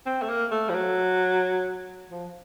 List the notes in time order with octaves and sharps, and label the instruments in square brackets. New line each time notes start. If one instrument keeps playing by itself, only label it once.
[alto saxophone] C4
A3
A#3
A3
F3
F#3
F3